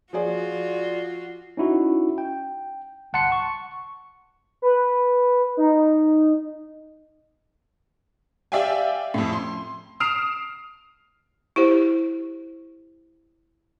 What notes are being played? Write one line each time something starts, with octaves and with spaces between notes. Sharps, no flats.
F3 F4 F#4 G#4 D5
C#4 D#4 E4 F#4
G5
G1 C2 F#5 A5 C6 C#7
C#6
B4
D#4
G4 D5 E5 F5 G5 G#5
F2 A2
C6
D#6 F6 C7 D7 E7 F7
E4 G4 C5